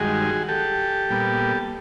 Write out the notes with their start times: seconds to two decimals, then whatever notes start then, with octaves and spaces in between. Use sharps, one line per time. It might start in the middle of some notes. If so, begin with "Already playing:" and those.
Already playing: G2 D#3 G#3 F#4 G#4
0.49 G4 A4
1.10 A#2 G3 B3